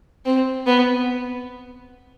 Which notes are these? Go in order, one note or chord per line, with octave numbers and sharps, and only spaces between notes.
C4
B3